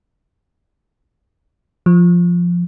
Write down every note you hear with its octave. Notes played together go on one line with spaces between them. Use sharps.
F3